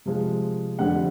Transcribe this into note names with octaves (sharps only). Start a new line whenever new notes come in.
C3 F3 G#3
F2 D3 G3 F#5